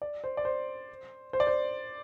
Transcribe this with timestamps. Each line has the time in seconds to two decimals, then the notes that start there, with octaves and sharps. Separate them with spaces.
0.02 D5
0.24 C5
0.37 D5
0.45 C5
1.33 C5
1.40 D5
1.47 C5